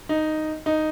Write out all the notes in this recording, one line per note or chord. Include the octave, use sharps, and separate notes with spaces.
D#4
D#4